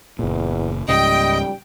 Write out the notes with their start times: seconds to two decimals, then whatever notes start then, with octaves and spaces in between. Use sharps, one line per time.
0.19 F#1 E2 A#2
0.88 C#2 G#2 C#3 G3 D#5 G5